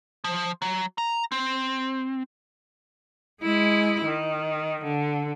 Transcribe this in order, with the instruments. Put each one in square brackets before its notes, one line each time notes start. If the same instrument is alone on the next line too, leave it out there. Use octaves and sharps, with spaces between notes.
[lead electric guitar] F3
F#3
A#5
C4
[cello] G#3 E4
D#3
D3